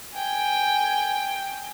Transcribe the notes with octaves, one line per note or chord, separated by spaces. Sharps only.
G5 G#5